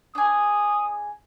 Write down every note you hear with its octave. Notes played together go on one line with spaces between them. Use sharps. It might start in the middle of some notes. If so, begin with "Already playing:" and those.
D4 G#4 D#6